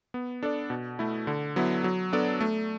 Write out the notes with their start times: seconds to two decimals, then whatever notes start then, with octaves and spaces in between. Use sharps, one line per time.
0.14 B3
0.43 D4 A4 D5
0.70 B2
0.99 A3 E4
1.27 D3
1.56 F#3 B3 E4
1.84 F#3
2.13 B3 D4 A4 D5
2.41 A3